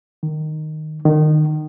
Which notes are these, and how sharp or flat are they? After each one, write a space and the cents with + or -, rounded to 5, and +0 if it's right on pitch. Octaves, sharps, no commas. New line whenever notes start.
D#3 -10
D#3 -25